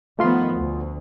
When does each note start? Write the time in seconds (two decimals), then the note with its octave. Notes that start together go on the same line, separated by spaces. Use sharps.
0.19 D#3 F3 A3 B3 F4 C6
0.53 D2